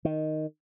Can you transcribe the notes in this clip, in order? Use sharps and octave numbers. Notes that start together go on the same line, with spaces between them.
D#3